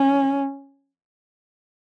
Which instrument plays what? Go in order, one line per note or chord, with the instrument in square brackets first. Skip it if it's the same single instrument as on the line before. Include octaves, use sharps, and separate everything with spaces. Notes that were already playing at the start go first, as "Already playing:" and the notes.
Already playing: [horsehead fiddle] C#4